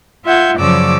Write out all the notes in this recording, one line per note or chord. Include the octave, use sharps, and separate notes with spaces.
F4 E5 F#5 G6 G#6
F#2 C#3 F3 D5 D6 E6